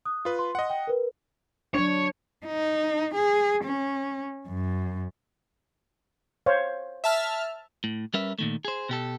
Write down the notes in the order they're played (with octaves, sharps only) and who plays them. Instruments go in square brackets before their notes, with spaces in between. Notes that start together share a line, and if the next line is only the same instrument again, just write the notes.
[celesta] D#6 F#6
[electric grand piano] F4 B4
[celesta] C6
[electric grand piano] D#5 F#5
[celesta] G5
A#4 B4
[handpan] F#3 D4 [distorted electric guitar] C#5
[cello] D#4
G#4
C#4
F#2
[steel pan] C5 C#5 F5
[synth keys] E5 A5 F6
[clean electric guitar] A2
G3 C#4 A#4 B4 E5
A#2 D#3 A3
G#4 C5
B2 G4 A4